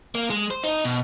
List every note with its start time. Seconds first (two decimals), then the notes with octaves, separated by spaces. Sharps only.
0.15 A#3
0.30 G#3
0.51 C5
0.64 D#4
0.84 B2